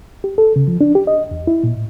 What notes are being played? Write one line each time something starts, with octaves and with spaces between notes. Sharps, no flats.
G4
A4
C#3
F3
D4
G4
D#5
E2
E4
A#2
A2